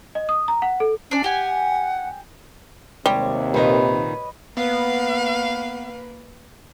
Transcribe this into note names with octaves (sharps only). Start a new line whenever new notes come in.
D#5
D#6
A#5
F#5
A4
C#4 D4 D5
G4 F#5 G#5
D#2 C3 G3 G#3 C#5
A#2 D#3 B4 D#5
A#3 B3 B4 F5